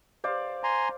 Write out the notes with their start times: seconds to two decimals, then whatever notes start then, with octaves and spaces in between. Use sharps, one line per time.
0.24 C5 D5 F5
0.64 G#5 A#5 C6